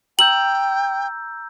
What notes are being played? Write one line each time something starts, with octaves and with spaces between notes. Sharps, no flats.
G5 A#5 E6 G6 F#7